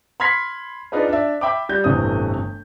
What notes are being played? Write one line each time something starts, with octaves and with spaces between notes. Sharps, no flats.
B5 C6 F6 G#6 B6 C7
D4 D#4 F4 G#4 B4
D4 E5
E5 G5 B5 D6
G3 G6
D1 G1 C3 E3 C4 D#6